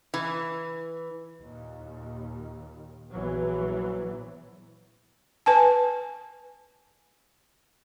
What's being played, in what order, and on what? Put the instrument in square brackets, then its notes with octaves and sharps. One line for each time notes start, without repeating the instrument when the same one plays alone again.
[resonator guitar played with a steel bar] E3
[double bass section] D#2 A#2
A#1 E3 F#3 B3
[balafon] B4 G#5 A5